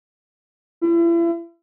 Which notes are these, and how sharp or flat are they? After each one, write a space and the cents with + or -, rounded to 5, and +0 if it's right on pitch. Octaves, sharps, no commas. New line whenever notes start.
E4 +40